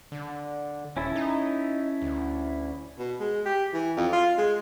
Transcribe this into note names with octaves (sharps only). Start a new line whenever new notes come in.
D3
D#1 C#4 E4 A4
D#4
D2
B2
G#3
G4
E3
F2
F4
G#3